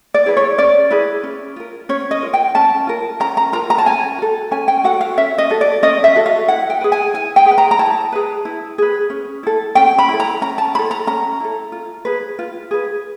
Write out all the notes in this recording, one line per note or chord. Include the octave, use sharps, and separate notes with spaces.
D5
E4 G#4 B4
C#5
C#4 D5
E4 G#4 B4
C#4
F4 A#4
C#4 C#5
D#5
F4 A#4
G5
C#4 A5
F4 A#4
C#4 A#5
A#5
F4 A#4 A#5
A#5
A5
C#4 G#5
F#4 A4
C#4 G#5
G5
F#4 A4 F#5
F5
C#4 E5
D#5
F#4 A4
D5
C#4 D#5
E5
F#4 A4
F5
E4 F#5
G5
G#4 B4
G#5
E4 G#5
G5
G#4 B4
A#5
A#5
E4 A5
G#4 B4
E4
G#4 B4
C#4
E4 A4
C#4 G5
B5
E4 A4
A#5
C#4 A#5
A5
E4 B5
A4
A#5
C#4 A#5
E4 A4
F4
G#4 B4
F4
G#4 B4